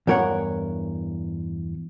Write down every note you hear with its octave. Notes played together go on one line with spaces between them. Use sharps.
E2 G2 A#4 C#5 F#5